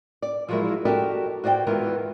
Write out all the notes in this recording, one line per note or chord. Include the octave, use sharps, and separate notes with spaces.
D5
F3 F#3 G#3 E4 A#4 E5
F#4 G4 A4 A#4 D5 D#5
F#4 C5 D5 E5 G5
G#2 D#3 E3 B3 F4 A#4